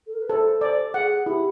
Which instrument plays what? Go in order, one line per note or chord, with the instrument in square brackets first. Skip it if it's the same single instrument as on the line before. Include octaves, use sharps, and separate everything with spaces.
[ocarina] A4
A#4
B4
[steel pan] A4 [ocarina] C5
[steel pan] D5
[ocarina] G#4 [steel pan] F#5
[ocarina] G#4
[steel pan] E4 [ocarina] G4